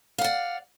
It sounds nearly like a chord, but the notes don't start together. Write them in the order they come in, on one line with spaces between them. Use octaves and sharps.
F5 F#5 D5